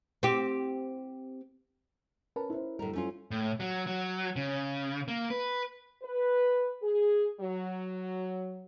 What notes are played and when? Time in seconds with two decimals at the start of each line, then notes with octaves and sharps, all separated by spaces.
0.23 C4 G4
2.36 C#4 A#4 B4 A5
2.50 E4 C5
2.79 A2 D3 G3 A#4
2.93 A3 C#4 F4
3.31 A2
3.60 F#3
3.87 F#3
4.36 C#3
5.08 A#3
5.30 B4
6.02 B4
6.82 G#4
7.40 F#3